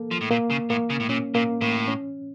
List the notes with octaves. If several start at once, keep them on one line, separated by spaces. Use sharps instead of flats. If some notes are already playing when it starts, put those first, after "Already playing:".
Already playing: A#3 A4
F3
A2
A#2 A#3
C#3
A2 A#3
C#3
A2
A#2 C#4
A#2 A#3
A2 A#3
C#4